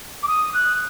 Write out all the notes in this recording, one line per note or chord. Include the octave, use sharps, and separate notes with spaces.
D6
D#6
F#6